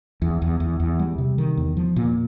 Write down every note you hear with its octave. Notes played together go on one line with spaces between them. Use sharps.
E2
E2
E2
E2
G3
C3
D#3
E2
F3
A#2